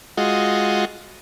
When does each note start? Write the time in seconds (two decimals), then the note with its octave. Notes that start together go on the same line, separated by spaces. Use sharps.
0.17 G#3 F4 F#4 D#5